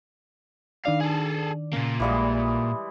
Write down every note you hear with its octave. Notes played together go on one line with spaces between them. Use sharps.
D#3 D4 D5 F5
G#4 A4
A#2 C#3 A#3
A#1 E3 G3 G#3 F5 D#6